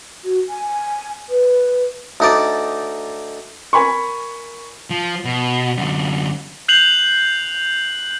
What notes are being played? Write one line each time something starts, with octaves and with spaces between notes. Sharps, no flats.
F#4
G#5
B4
D2 D#4 D5
A#4 G#5 B5 C#6
F3
B2
F#2 D3
F#6 G6 C7 F7 F#7